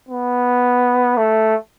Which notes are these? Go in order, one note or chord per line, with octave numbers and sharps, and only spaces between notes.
B3
A3